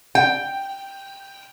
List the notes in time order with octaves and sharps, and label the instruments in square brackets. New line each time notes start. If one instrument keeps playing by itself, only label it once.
[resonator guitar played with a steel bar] G5